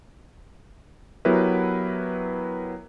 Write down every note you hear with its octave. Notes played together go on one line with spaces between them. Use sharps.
F#3 B3 E4 G4 A#4 B4